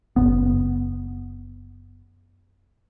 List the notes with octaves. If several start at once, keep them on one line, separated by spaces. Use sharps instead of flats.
F#1 F#2 B3